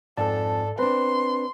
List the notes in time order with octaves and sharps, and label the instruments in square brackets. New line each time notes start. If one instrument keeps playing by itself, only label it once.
[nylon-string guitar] F2 G#5 [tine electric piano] G#2 D5 A5 [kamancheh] A4
[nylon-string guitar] C4 D4 [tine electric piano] B4 [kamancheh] C6